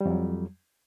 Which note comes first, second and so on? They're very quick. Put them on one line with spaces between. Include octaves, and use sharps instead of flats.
G3 F2 F#3